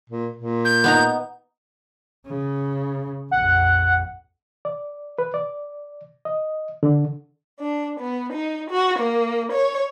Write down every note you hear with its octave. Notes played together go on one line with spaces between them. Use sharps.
A#2
A#2
G6
B3 D#4 A#5
C#3
A#1 F2 F#5
D5
B4
D5
D#5
D3
D4
B3
D#4
F#4
A#3
C#5